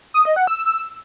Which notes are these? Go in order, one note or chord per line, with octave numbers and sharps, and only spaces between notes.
D#6
D#5
F#5
E6